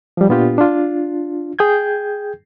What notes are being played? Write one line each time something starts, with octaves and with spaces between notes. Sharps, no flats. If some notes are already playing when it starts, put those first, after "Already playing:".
F3 G3
A#2 B3 D4 F4 G4
D4 F4
G#4 G5 G6 G#6